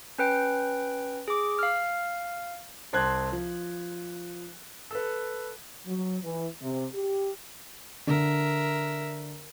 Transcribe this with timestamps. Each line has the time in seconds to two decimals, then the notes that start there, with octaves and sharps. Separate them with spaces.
0.18 C#4 B4 G5
1.28 G#4 D6
1.59 F5 F6
2.93 C2 C4 A5 C6 F#6 G#6
3.32 F3
4.91 A4 B4
5.87 F#3
6.23 E3
6.62 C3
6.94 G4
8.07 D3 A#4 E5